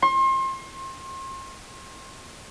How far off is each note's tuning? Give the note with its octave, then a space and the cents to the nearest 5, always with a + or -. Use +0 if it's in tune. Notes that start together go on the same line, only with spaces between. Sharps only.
C6 +35